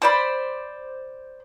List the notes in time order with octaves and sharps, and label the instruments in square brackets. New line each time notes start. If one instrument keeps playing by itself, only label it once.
[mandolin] C5 D5 B5